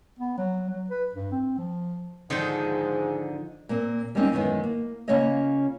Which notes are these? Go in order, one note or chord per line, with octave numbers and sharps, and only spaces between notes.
B3
F#3
F#3
B4
G2
C4
F3
G#2 D3 D#3 F3 D#4 C5
A#2 A#3 C4
G3 G#3 A#3 C4 C#4 D#4
F#2 D#3 E3 G#3 B3
A#3
C#3 A#3 C#4 F4 C#5 D#5